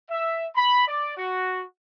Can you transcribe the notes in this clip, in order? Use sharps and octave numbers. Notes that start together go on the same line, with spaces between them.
E5
B5
D5
F#4